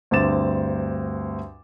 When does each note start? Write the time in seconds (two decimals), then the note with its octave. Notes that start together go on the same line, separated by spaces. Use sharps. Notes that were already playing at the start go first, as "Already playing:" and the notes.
0.11 D2 G2 C4 D6 A6 E7